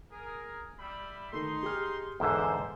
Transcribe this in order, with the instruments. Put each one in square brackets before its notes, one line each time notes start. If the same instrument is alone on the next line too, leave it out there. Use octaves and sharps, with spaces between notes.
[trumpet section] G#4 A#4
G3 E5 B5
[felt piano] D#3 A3 [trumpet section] D#4 C6
[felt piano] G4 G#4 F6
[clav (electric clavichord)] E2 G#2 D3 [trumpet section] E4 C5 [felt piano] G#4 A4 B4